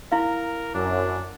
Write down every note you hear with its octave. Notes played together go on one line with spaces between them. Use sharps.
E4 A#4 F5
F#2 D4